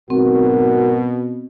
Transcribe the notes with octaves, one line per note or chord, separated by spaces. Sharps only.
G#1 B2 F#3 C4 F#4 A#4